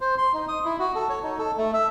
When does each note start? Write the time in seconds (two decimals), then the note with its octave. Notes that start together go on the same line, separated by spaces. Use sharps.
0.01 C5
0.18 C6
0.34 D#4
0.48 D#6
0.65 E4
0.79 F#4
0.95 A4
1.10 C#5
1.23 D#4
1.39 A4
1.58 A3
1.73 E5